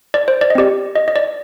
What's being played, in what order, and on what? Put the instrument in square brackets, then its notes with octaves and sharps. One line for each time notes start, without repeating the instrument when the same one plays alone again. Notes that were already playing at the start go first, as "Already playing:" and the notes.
[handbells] D5
C5
D5
D#5
C4 G4 D5
D#5
D#5
D5